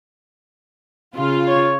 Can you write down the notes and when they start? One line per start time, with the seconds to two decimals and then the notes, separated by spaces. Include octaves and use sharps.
1.16 C#3 F4
1.48 C#5